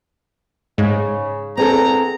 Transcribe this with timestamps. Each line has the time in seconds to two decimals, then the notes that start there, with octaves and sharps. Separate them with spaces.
0.78 G#2 C#3
1.57 E2 C4 G#4 A4 A#5